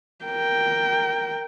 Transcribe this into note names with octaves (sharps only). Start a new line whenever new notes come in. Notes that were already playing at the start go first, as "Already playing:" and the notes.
A#4 G5